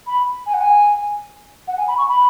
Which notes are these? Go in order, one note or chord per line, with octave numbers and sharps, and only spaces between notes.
B5
G#5
F#5
G#5
F#5
G#5
B5
C#6
B5